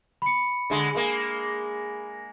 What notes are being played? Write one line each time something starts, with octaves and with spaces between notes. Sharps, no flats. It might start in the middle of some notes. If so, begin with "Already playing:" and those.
B5 C#7
D3 G#3
G#3 A#3